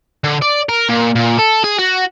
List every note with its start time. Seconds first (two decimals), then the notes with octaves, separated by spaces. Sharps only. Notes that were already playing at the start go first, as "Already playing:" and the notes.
0.24 D3
0.42 D5
0.69 A#4
0.89 A#2
1.15 A#2
1.38 A4
1.64 G#4
1.79 F#4